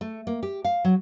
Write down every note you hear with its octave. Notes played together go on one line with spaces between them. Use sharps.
A3
A#3
G4
F5
F#3